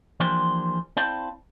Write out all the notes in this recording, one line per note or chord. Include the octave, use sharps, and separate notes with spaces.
E3 F3 A#3 D4 G4 C5
C4 E4 C5 D5 F5 A5